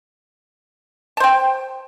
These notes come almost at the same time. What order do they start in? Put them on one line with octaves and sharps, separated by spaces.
A5 C5 G5